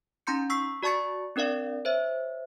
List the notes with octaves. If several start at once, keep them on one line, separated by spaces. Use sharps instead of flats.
C#4 D#4 A#5 C6 G6 C#7
C#6 E6 B6 C7
F#4 D5 A5 C#6 A6 C#7
C4 D4 A#4 D5 F5
C5 C#5 E5